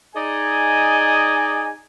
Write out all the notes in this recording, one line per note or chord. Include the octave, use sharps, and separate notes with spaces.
D#4 G#4 D5 D#5 G#5